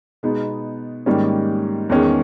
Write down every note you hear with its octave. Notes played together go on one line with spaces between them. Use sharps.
B2 G#3 B3 D#4
G#2 D#3 G3 A#3 C#4
E2 D#3 G#3 C#4